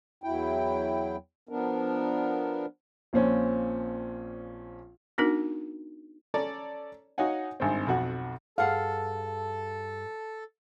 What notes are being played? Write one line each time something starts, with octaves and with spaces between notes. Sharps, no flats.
E2 F#3 E4 G5
F3 B3 D4 A#4
A#1 A#2 C4 C#4
B3 D4 D#4 F#4 A#4
C#4 A4 C#5 D5 A#5
D#4 F#4 C#5 F5 F#5 G#5
G#1 G2 C4
B1 F2 F#4 F#5
G2 G#4 A4 F5 F#5